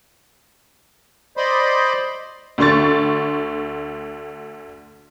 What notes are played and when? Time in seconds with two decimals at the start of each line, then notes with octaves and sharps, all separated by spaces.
1.37 C5 D5 D#5 B5 C6
2.58 D2 D3 C6 C#6 A6